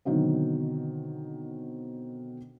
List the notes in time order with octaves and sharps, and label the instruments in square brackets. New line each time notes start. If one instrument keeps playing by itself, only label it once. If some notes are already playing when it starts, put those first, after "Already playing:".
[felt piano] B2 D3 D#3 F#3 C4